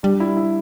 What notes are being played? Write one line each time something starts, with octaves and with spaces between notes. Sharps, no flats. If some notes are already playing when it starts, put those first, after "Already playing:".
G3 D4
E4
E4